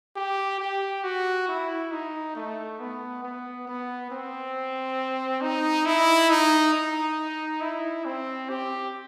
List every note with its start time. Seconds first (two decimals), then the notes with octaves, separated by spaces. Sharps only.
0.16 G4
0.60 G4
1.03 F#4
1.48 E4
1.91 D#4
2.35 A3
2.80 B3
3.23 B3
3.67 B3
4.11 C4
5.41 D#4
5.86 E4
6.30 D#4
6.73 D#4
7.61 E4
8.05 C4
8.49 G4